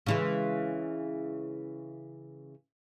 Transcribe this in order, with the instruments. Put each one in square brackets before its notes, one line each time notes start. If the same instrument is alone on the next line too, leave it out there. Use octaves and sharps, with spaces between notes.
[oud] C#3 E3 G#3